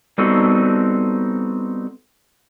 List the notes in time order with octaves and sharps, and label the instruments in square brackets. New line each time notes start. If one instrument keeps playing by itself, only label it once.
[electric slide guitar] G3 B3 C4 D#4 F#4 A4